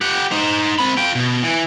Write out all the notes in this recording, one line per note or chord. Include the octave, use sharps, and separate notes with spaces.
G4 F#5
D#4 C5
C4 B5
F4 G5
B2
E3